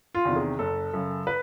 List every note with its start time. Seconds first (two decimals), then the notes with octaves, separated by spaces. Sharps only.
0.15 F4
0.25 E2 C3 D#3
0.36 G#4
0.59 F#1 A4
0.94 F#2 C#3
1.27 B4